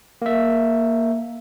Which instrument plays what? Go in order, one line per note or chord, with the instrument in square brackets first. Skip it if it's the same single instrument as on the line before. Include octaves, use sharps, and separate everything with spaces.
[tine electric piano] A#3 E5